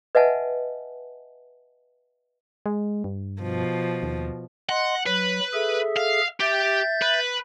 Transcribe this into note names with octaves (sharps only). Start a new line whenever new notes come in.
B4 D#5 E5 F#5 G#5 A5
G#3
G2
B2 F3
D#2
D#5 F#5 C6
F#3 B4
G#4 A4 E5
F5
G4 E5 G6 A6
B4